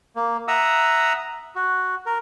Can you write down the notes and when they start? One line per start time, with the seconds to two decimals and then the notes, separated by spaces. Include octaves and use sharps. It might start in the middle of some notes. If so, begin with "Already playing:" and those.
0.16 A#3
0.48 E5 F#5 A#5 D#6 E6
1.55 F#4
2.06 A#4